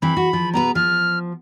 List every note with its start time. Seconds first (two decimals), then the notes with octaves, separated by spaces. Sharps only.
0.02 E3 C4 B5
0.17 F#4
0.33 F3
0.54 B2 B3 B4 A#5
0.75 F3 F6